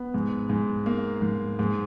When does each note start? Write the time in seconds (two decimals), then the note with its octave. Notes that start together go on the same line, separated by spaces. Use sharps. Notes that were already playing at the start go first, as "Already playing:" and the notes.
Already playing: B3
0.14 G#2
0.49 G#2
0.86 A#3
1.22 G#2
1.59 G#2